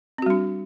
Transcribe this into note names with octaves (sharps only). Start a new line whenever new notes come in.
G3 C4 D4 F#4